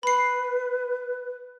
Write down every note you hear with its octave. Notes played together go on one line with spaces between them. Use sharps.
B4 B5 C7